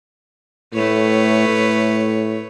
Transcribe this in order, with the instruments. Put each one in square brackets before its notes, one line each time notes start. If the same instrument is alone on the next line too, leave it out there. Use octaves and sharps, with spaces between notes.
[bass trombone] A2 [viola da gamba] A3 B4 C#5
[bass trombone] A2